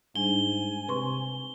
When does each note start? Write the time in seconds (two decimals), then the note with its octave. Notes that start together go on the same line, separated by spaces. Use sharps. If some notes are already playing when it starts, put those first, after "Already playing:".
0.15 G#2 G3 D4 G#5 G7
0.88 C3 B4 C6 C#6